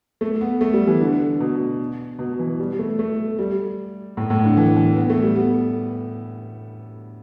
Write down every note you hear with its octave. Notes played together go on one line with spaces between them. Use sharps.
A3
B3
A3
G3
E3
D3
B2
B2
E3
G3
A3
A3
G3
A2
A2
D3
E3
E3
B3
A3
G3
B3